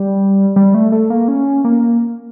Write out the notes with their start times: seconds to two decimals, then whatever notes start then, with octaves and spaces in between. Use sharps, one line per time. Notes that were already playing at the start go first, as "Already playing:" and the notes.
Already playing: G3
0.56 G3
0.74 A3
0.92 A3
1.10 A#3
1.28 C#4
1.64 A#3